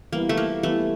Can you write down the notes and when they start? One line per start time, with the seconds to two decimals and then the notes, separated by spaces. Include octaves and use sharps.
0.13 E3 G3 A#3 B3 E4
0.29 A3
0.37 A#3
0.63 E3 G3 A3 B3 E4